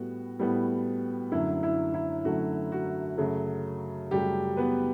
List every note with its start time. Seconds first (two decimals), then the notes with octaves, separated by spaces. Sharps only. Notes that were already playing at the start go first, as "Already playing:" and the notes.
Already playing: A2 G3 B3 F#4
0.39 A2 G3 B3
1.32 F#2 D3 F#3 A3 E4
1.63 E4
1.94 E4
2.25 F#2 D3 F#3 A3 F#4
2.72 F#4
3.18 F#2 C#3 F#3 A3
4.11 F#2 C#3 F#3 G3 A3 G4
4.57 B3 B4